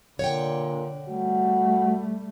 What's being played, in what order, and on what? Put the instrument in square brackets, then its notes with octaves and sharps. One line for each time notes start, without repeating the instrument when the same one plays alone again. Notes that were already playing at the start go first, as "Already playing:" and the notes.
[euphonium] A#2 [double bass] D3 [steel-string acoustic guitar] C#5 F#5 G5
[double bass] G3 A3 [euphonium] F#4